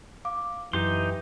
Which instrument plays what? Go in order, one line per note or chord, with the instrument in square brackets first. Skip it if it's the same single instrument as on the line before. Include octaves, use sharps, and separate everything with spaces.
[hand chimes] F5 D6
[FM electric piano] F#2 [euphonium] E3 [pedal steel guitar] D#4 G4 C6 [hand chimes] G6